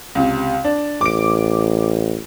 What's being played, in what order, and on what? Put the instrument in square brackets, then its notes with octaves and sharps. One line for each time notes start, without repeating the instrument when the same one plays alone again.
[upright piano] C#2 C3
D4
[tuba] A1 [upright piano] D6 D7